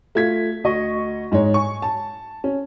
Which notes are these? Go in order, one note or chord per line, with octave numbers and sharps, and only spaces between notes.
A3 F4 G#6 B6
D2 D#5 C#6
G#2 G#3 D#4 C#5
G#5 C#6
A5
C#4